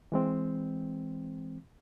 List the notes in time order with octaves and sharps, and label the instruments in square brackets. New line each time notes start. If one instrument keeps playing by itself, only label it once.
[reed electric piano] E3 G#3 C4